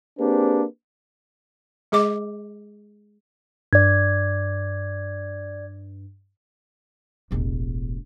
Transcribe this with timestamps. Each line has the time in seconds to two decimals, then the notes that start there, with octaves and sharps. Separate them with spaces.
0.19 A#3 C4 D4 G4 G#4 B4
1.92 G#3 G#4 D#5 D6
3.73 G2 D5 G#6
7.31 E1 A1